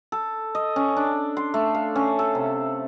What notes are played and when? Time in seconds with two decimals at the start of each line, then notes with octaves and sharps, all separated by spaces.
0.12 A4
0.55 D#5
0.76 C#4
0.96 D4
1.37 C6
1.54 A3
1.75 F5
1.96 C#4
2.19 A4
2.35 C3